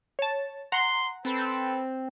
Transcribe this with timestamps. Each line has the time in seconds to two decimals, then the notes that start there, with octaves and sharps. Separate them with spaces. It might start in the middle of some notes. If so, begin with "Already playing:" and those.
0.19 C#5 A5
0.72 F#5 A#5 C6
1.25 C4 A4 B4